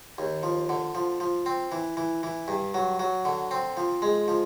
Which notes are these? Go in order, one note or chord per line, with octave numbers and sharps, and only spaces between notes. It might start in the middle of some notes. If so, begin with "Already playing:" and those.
D#2
F3
D3
F3
F3
C4
E3
E3
E3
G2
F#3
F#3
D3
C4
F3
G#3
F3